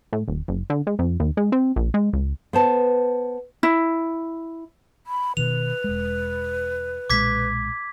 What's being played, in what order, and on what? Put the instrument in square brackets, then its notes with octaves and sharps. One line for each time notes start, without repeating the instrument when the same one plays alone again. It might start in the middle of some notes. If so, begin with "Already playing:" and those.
[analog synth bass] A2
D#1
F#1
D3
G#3
F2
D#2
G#3
C4
A#1
G#3
C#2
[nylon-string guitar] B3 C5 A5
[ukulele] E4
[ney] B5
[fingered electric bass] B2 D#3 [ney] B4 [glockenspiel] F7
[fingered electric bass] E1 G#3
[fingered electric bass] B1 A#2 G#3 [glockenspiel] D6 G#6 B6